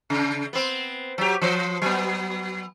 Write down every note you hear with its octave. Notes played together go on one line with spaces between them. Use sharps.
C#3
B3 C4
F#3 G4
F3 C5
F#3 B3